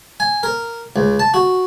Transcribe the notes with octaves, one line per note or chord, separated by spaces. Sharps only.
G#5
A#4
C#2
A5
F#4